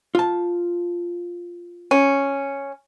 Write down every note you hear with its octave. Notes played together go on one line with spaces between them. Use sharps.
F4 A5
C#4